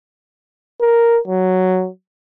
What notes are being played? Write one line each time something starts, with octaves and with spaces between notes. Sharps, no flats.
A#4
F#3